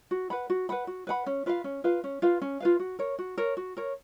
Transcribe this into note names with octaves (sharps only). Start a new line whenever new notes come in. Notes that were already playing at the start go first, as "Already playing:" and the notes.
F#4
B4 F#5 B5
F#4
B4 F#5 B5
F#4
B4 F#5 B5
C#4
F4 B4 F5
C#4
F4 B4 F5
C#4
F4 B4 F5
C#4
F4 B4 F5
F#4
A#4 C#5
F#4
A#4 C#5
F#4
A#4 C#5